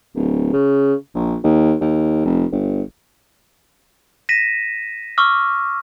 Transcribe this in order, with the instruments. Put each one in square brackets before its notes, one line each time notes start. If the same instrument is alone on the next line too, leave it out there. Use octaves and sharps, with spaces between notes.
[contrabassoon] D1
C#3
A#1
D#2
D#2
F1
G1
[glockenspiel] A#6 B6 D#7 E7
C#6 D6 E6 F6